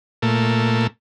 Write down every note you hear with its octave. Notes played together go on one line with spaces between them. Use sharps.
A#2 A3